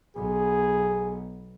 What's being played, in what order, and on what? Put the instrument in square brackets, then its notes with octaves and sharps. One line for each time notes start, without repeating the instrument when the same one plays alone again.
[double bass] B1 B3 [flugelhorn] G#4